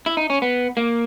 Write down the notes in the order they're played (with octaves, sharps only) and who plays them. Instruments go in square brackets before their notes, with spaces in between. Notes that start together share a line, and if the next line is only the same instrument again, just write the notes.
[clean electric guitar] E4
D#4
C#4
B3
A#3